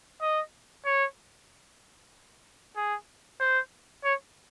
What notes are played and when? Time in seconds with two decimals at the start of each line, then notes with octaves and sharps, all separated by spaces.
0.22 D#5
0.85 C#5
2.76 G#4
3.40 C5
4.04 C#5